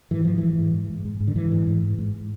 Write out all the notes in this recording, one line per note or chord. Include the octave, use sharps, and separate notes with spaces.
G#2 E3
G#2 F3
E3
G#2
G#2
G#2
G#2
G#2
G#2
D3
G#2 E3
G#2
G#2
G#2
G#2